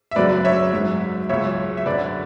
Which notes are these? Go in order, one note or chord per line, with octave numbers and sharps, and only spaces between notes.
E5
F#2 C#3 F#3 B4 D5
C#5 E5
G#2 F#3
C#2 C#3 F#3 C#5 E5
E5
F#2 D3 F#3 B4 D5